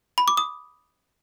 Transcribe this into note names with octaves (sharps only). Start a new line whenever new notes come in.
B5
D6
D#6